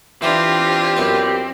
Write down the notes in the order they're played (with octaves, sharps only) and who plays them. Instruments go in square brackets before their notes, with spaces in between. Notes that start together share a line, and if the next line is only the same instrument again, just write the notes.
[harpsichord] E3 [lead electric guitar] C4 [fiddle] D4 F4 [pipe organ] G4
[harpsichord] F#2 B3